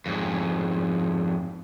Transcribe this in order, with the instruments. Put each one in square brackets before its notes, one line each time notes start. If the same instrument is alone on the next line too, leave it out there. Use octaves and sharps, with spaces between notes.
[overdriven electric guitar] F2 G#2